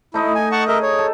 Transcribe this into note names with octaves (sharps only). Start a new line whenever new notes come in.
A3 D#4 E4 D#5
G#5
F#5 A5 C#6
G#4 A#4 D#5 E5
C#5
A4